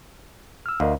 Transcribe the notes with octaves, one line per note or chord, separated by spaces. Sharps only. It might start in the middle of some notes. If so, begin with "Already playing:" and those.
E6 F6
D2 A#4 D#5 F5